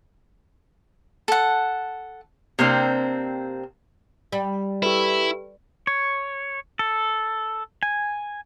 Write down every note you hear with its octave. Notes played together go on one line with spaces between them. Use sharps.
A4 F#5
C3 A#3 C4 D4
G3
E4 G4 A4 B4
C#5
A4
G#5